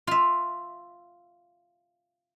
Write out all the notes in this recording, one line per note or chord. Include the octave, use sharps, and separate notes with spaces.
F4 E5